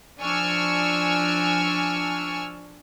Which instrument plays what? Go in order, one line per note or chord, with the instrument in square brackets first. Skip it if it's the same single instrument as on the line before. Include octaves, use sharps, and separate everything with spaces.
[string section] F3 D4 G#5 C#6 E6 F6